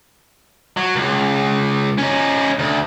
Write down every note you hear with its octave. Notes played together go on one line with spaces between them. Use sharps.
F#3
C#2
C#4 D#4
D2